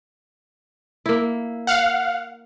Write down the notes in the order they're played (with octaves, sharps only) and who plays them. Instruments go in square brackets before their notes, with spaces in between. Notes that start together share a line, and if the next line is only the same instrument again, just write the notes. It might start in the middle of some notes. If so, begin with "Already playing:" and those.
[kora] A#3 E4
[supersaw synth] F5 F#5